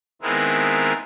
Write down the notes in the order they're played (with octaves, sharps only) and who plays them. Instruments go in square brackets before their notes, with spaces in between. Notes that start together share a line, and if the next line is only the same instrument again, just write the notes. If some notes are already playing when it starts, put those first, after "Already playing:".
[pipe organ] D#3 G#3 B3 C4 E4 A#4